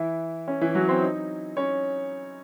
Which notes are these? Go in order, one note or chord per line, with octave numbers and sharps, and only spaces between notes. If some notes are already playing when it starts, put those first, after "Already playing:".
Already playing: E3 E4
C#4
E3 E4
F#3 F#4
C4 C5
D#4
C#4 C#5